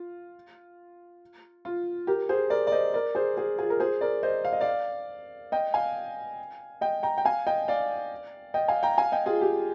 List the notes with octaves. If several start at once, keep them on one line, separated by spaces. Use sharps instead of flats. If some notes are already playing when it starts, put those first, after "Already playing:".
Already playing: F4
F4
G4 A#4
G#4 C5
A#4 D5
D5
C5 D#5
A#4 D5
G#4 C5
G#4 C5
F4 G#4
A#4
G#4 C5
A#4 D5
C5 D#5
F5
D#5
D5 F5
D#5 G5
F5 G#5
D#5 G5
G5 A#5
G5
F5 G#5
D#5 G5
D5 F5
D#5 G5
F5 G#5
G5 A#5
F5 G#5
D#5 G5
F4 G#4
G4